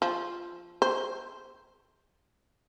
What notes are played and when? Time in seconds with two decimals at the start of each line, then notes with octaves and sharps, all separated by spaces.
0.02 F3
0.82 C5